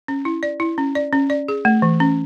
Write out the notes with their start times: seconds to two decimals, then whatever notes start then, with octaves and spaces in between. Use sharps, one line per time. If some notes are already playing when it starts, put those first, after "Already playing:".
0.08 C#4
0.25 E4
0.43 D5
0.60 E4
0.78 C#4
0.95 D5
1.13 C#4
1.30 D5
1.48 G#4
1.65 A3
1.82 E3
2.00 C#4